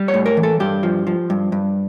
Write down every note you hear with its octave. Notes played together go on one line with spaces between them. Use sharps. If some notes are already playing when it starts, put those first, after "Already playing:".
Already playing: G3
C#5
A2
A#4
E3
A4
G2 G4
F3
F3
G2
G2